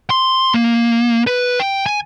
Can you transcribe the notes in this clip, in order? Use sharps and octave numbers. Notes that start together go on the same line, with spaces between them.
C6
A#3
B4
G5
G#5